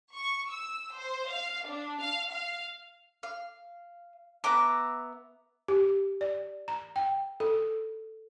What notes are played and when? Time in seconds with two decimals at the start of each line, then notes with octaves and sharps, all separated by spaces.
0.15 C#6
0.51 E6
0.96 C5
1.29 F5
1.67 D4
2.01 F5
2.32 F5
3.23 F5
4.44 B3 E5 A#5 D6
5.68 G4
6.21 D5
6.68 A#5
6.96 G5
7.40 A4